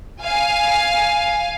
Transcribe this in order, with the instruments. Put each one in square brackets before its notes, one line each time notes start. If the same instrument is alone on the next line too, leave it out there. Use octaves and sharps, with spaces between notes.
[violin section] F5 G#5